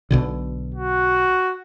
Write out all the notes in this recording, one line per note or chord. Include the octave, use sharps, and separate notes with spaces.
B1 B2 D3
F#4